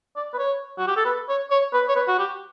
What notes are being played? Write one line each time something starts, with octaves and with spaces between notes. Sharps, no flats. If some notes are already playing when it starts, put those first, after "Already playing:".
D5
B4
C#5
F#4
G4
A4
B4
C#5
C#5
B4
C#5
B4
F#4
G4